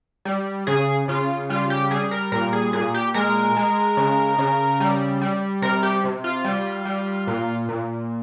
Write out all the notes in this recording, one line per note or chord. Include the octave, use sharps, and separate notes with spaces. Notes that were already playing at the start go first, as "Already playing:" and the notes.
G3
C#3 G#4
C#3 F4
G3 F4
G4
G3 G#4
A#4
A#2 A#4
G#4
A#2 G#4
G4
G#3 A#4
G#3
C#3
C#3
G3
G3
C3 A#4
G4
C3
F4
G3
G3
A#2
A#2